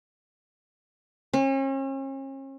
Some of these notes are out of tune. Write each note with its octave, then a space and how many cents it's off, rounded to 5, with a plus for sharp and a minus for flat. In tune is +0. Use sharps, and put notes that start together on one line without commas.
C#4 -40